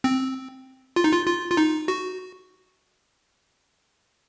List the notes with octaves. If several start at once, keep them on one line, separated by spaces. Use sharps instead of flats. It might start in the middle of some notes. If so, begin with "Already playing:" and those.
C4
F4
D#4
F4
F4
F4
D#4
F#4